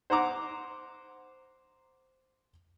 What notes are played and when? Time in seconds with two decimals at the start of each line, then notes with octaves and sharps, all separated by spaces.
0.10 C5 F#5 A#5 D6